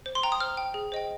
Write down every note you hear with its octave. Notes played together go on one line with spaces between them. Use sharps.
C5
C6
G5 A#5
D#6
C5 F6
G5
G#4
C5 D#5 G5